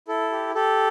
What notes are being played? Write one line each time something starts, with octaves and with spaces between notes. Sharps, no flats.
E4 A4
G4
G4 A4